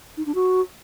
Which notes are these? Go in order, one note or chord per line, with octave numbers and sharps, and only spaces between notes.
D#4
D4
F#4